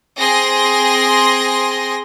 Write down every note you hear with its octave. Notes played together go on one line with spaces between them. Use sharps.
C4 G#4 C6 A#6